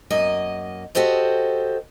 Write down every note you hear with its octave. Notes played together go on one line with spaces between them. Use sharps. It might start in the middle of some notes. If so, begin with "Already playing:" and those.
F#2 A#3 D#5
F#4 G4 A4 C5 D#5